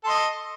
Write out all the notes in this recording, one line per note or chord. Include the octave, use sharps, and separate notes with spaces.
A4 D#5 C6